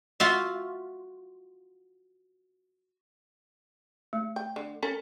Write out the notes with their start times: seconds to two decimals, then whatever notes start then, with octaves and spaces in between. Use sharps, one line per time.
0.20 F4 F#4 E5
4.13 A3
4.36 G5
4.56 D3
4.83 C#4 A4 A#4